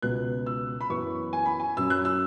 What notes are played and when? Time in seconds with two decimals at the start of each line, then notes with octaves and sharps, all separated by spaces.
0.02 C#2 B2 B3 F#6
0.46 E6
0.81 B5
0.90 F#2 E3 B3 C#6
1.33 G#5
1.46 B5
1.60 G#5
1.77 F#2 F#3 C#4 E6
1.90 F#6
2.05 E6